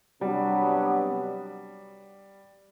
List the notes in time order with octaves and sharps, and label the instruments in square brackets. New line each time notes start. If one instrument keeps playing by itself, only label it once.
[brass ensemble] C3 F#3 B3 D4 [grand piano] G3